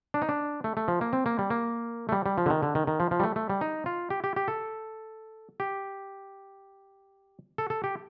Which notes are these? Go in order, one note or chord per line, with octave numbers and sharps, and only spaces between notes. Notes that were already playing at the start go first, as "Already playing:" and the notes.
D4
D#4
D4
A3
A3
F3
A#3
C4
A#3
G3
A#3
A3
G3
G3
F3
D3
D#3
D3
D#3
D#3
F3
F3
G3
A3
A3
G3
D#4
F4
G4
G4
G4
A4
G4
A4
A4
G4